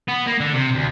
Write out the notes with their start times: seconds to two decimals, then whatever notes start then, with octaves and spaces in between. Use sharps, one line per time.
0.08 B3
0.27 A#3
0.40 D3
0.54 C3
0.75 D2